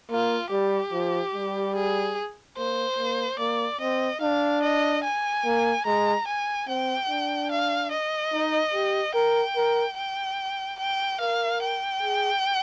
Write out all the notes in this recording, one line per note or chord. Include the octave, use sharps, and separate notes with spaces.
A#3 F4
G3 G4
F3
G3
G#4
A#3 C5
A#3
A#3 D5
C4 D#5
D4 F5
D#5
G#5
A#3
G#3 A#5
G#5
C4 G5
D4
F5
D#5
D#4
G4
A#4 G5
A#4
G5
G5
A#4 F5
G5
G#4